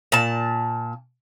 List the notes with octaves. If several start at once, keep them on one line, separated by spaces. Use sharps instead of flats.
A#2 A5